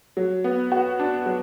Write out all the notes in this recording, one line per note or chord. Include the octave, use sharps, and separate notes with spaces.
F#3
B3
F#4
D4
F#3